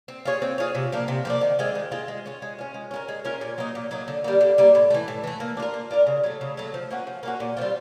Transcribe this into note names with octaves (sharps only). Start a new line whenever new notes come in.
C4
F4 G#4 C#5
C4
F4 G#4 C#5
C3
F3 A#3 D4
C3
F3 A#3 D4
D#3
G#3 C4 F4
D#3
G#3 C4 F4
G#3
C#4 F4
G#3
C#4 F4
G#3
C#4 F4 A#4
G#3
C#4 F4 A#4
A#2
F#3 A#3 D#4
A#2
F#3 A#3 D#4
D3
G3 A#3
D3
G3 A#3
A2
E3 A3
A2
E3 A3
A#3
D4
F4 A#4
A#3
D4 F4 A#4
C#3
F#3 A3
C#3
F#3 A3
F3
A#3 C#4 F#4
F3
A#3 C#4 F#4
A#2
G3 C4 F4